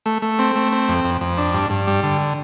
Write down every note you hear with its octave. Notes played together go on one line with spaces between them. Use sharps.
A3
A3
C4
A3
C4
F2
F2
F2
D4
G2
G2
G3
D3